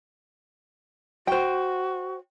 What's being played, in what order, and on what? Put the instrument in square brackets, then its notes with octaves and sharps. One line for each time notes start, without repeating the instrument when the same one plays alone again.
[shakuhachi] F#4 [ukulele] C5 G5